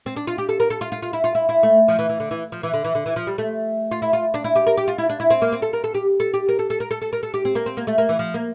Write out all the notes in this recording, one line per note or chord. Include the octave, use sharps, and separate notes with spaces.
C4
D4
F4
G4
A4
A#4
A4
F4
F4
F4
E4
F4
E4
E4
A3
F3
E3
E3
D3
E3
F3
E3
D3
E3
D3
E3
F3
G3
A3
F4
E4
F4
D4
E4
G4
A#4
G4
F4
E4
D4
E4
C4
A#3
C4
A4
A#4
A4
G4
A4
G4
A#4
A4
A4
A#4
A4
A4
A#4
A4
G4
C4
A#3
C4
A#3
A3
A#3
E3
F3
A#3